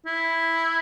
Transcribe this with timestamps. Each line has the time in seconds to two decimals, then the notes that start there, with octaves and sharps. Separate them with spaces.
0.06 E4